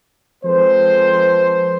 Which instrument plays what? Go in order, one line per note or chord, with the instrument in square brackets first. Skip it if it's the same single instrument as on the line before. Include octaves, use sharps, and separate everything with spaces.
[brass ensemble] F3 G#3 C4 A4 B4 C5